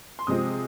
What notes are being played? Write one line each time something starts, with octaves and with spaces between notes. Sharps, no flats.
C6
C3 F3 G#3 C4 D#6